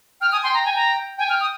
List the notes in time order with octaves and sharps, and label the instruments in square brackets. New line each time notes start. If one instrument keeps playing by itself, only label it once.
[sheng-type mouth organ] G5 [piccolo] F6
[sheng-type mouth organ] G#5 [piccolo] D#6
[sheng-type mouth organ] G5 [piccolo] C6
[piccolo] A#5
G#5
A#5
[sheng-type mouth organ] G5 [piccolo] G#5
[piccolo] F6
D#6